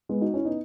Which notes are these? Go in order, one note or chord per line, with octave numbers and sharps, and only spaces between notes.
G#3 B3
D#4 F#4
C#4 E4
B3 D#4